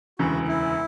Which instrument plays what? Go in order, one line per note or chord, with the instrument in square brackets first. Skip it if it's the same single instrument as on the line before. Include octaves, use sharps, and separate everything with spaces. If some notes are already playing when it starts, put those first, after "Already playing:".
[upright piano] E1 D2 C#3 E3 [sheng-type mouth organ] F#4
[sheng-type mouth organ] E4